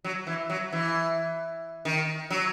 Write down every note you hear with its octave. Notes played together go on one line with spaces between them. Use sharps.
F#3
E3
F#3
E3
D#3
F#3